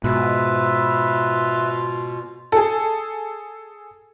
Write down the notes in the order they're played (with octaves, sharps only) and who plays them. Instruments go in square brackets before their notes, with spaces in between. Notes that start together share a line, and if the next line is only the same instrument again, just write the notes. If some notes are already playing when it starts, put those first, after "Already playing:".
[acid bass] G#2 [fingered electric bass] B2 [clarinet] F4 [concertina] B4 E5
[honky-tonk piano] G#4 A4